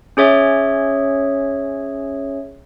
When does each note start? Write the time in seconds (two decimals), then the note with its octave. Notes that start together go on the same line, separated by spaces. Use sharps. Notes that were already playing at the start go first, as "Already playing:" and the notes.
0.17 C#4 G#4 C#5 E5